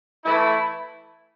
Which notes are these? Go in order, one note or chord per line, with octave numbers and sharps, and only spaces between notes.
E3 A3 E4